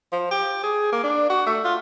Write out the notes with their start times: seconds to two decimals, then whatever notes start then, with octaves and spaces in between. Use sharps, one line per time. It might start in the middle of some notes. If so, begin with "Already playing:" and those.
0.12 F3
0.31 G4
0.63 G#4
0.92 A#3
1.04 D4
1.30 F#4
1.47 A3
1.65 F4